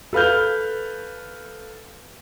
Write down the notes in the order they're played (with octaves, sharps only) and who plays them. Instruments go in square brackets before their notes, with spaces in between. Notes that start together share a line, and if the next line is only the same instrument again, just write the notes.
[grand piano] A4 B4 F5 F6 G6